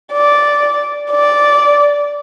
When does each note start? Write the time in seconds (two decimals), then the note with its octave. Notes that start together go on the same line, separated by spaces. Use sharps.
0.12 D5
1.11 D5